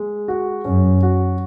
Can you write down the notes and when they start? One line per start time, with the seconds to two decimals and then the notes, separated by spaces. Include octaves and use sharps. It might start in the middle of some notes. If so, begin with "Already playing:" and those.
Already playing: G#3
0.28 F#4
0.65 F#2 C#4
1.03 F#4